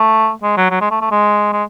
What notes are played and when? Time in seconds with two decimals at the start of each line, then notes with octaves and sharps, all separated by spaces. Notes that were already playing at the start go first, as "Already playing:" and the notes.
Already playing: A3
0.42 G#3
0.57 F#3
0.70 F#3
0.81 G#3
0.90 A3
1.01 A3
1.11 G#3
1.53 G#3